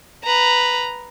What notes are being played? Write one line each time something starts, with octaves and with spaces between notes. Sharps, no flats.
B4 A#5